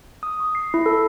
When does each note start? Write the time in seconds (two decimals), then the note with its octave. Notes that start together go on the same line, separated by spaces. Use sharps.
0.23 D#6
0.40 C#6
0.55 C7
0.74 E4
0.86 A4